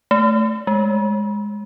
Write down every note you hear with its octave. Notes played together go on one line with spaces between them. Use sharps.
A3
G#3